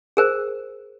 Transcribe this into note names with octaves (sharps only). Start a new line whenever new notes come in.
G#4 A#4 C5